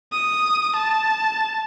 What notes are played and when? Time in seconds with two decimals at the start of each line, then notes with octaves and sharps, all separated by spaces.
0.12 D#6
0.76 A5